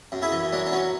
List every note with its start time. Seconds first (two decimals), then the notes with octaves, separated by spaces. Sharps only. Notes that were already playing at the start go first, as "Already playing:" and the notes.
0.12 F#2
0.22 E4 G#4
0.32 E3
0.52 F#3 D4
0.66 D4
0.72 F#3 C#4